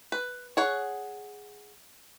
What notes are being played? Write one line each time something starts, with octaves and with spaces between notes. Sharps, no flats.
B4
G#4 C#5 F#5